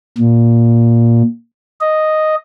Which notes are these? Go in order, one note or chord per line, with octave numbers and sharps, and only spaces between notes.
A#2
D#5